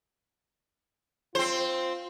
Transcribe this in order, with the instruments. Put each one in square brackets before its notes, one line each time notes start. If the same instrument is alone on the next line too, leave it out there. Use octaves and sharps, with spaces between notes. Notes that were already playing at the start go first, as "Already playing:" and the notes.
[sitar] C4 C5 [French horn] F4